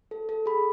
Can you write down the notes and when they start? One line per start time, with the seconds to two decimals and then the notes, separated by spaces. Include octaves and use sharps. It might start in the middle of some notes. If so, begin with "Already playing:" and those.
0.11 A4
0.29 A4
0.46 G#4 B5